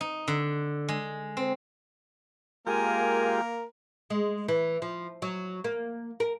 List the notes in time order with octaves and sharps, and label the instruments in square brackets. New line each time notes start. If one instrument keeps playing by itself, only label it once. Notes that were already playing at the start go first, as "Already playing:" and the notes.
[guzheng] D#4
D3
G#3
C4
[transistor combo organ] G#3 F4 G4 [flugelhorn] A#3 [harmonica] A#4 [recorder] G#5
[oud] G#3
E3
F3
F#3
A#3
A#4